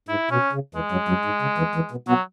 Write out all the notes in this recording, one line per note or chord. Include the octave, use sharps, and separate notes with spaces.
G#2 E4
B2 C#4
C#3
E2 E3 G#3
F#2 F#3
F#2 F#3
G#2
C#3
E2 E3
E2 E3
B2
B2 F#3 B3